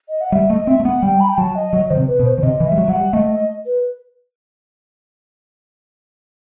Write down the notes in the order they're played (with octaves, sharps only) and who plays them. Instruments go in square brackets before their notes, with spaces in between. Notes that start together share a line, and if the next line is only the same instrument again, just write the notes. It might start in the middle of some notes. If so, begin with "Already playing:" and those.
[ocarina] D#5
F#5
[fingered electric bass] G3 [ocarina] E5
[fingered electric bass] A3 [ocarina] D#5
[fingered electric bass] C4 [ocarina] E5
[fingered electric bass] A3
[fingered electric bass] B3 [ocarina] F#5
[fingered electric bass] G3 [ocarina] G5
[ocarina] B5
G5
[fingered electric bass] F#3 [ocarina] A5
[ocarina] D#5
[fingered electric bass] F#3 [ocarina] D#5
[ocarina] D#5
[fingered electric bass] D#3 [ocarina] C5
[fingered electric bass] C3
[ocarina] B4
[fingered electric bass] B2
[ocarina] C5
[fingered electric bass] D#3 [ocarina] C5
[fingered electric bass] C3 [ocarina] D#5
[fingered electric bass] E3
[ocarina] E5
[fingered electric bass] G3
F#3
[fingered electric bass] F#3 [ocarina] F#5
[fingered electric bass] G3
[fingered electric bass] A3 [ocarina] D#5
[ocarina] D#5
B4